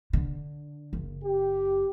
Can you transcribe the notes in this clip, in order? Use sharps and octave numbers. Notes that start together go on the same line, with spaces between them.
D3
F#1
G4